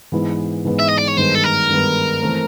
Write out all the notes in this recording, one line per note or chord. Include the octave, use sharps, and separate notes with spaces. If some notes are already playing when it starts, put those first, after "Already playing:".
G#2 E3 G#3 B3 E4
G#2 E3 G#3 B3 E4
E5
D#5
D5
C#5
G2 D#3 G#3 B3 C5
A4
A#4
G2 D#3 G#3 B3
E3 A3 C4